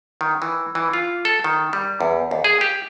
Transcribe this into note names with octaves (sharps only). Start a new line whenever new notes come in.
D#3
E3
E3
F4
A4
D#3
G3
E2
D#2
G#4
G4